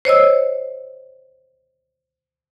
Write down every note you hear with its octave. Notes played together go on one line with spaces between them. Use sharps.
C5 C#5 D#5 E6